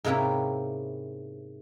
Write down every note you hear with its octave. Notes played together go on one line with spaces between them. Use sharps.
G#2 C3 A#3 C#4 E4 G4